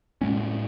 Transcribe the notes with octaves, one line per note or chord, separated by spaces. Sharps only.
A2 G#3 C#4